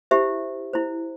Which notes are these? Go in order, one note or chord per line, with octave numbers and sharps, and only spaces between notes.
E4 G4 C5 E5
E4 C5